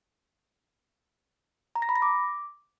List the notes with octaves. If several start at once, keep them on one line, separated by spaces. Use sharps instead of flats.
A#5
A#6
B5
A#6
D6